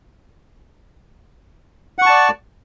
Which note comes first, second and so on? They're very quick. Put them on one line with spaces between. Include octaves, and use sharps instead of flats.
F#5 C#6 A5 D5